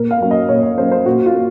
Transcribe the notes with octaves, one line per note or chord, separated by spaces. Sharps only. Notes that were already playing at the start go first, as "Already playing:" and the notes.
Already playing: A#2 A#4
F5
F#3 A#3 C#4
D#5
A#2 C#5
D#5
F#3 A#3 C#4 C5
C5
A#2 F#4
F4
A#3